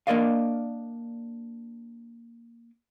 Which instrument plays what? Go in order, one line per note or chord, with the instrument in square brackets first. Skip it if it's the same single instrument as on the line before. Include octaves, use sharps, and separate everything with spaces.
[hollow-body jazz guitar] A#3 D4 A#4 D5 D#5 F5